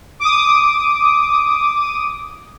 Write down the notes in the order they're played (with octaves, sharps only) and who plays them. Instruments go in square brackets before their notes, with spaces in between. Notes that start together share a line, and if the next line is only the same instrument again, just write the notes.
[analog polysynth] D6 D#6